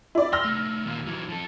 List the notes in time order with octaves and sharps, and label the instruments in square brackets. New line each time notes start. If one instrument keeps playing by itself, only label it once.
[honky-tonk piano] E4 D5
[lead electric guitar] C6 [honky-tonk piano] E6 F6 A#6
[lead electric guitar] C2 A3
D#2 A#2
E3 F#3
F3 A4